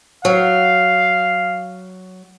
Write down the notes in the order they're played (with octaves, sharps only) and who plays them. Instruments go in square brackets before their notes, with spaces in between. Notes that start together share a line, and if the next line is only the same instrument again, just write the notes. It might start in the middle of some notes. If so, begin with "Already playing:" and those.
[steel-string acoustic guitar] F#3 [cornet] F5